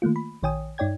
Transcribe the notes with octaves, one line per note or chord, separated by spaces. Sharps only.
D#3 A3 A#3 F4
B5
A#1 D#3 C#5 G5 G#5 D#6
G2 D#4 C#5 D5 G5 G#6